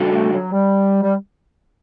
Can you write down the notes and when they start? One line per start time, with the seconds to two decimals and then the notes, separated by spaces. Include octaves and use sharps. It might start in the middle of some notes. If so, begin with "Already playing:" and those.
Already playing: C#3 G3 D4 F#4 A4
0.12 A3
0.32 F#3
0.53 G3
1.03 G3